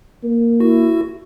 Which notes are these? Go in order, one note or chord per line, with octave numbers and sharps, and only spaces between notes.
A#3
E4 F#4